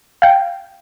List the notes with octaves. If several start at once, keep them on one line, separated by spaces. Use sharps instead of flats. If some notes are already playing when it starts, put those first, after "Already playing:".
F5 G5